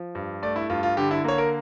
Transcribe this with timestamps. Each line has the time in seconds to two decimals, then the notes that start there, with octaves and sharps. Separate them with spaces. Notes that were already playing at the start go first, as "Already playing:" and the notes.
Already playing: F3
0.15 G2
0.42 A3 D5
0.56 E4
0.70 G2 F4
0.83 F4
0.97 D3 G4
1.11 E4
1.24 A#3 C#5
1.38 A#4